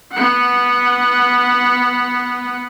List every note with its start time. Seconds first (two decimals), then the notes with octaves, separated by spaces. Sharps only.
0.12 B3 F#5